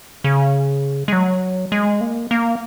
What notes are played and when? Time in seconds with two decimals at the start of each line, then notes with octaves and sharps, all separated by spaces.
0.24 C#3
1.08 G#3
1.13 F#3
1.72 G#3
2.01 A#3
2.31 A#3